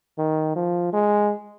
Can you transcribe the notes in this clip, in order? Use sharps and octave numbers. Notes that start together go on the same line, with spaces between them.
D#3
F3
G#3